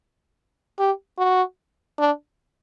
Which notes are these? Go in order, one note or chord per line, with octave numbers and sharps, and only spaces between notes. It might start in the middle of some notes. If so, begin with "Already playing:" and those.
G4
F#4
D4